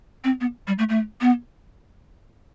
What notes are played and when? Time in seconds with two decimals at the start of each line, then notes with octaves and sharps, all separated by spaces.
0.24 C4
0.41 B3
0.67 G3
0.79 A3
0.89 A3
1.21 B3